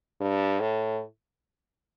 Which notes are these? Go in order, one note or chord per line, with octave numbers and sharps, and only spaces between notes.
G2
A2